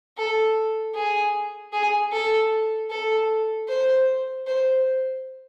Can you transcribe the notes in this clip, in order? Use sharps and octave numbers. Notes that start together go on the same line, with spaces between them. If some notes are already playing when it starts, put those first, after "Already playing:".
A4
G#4
G#4
A4
A4
C5
C5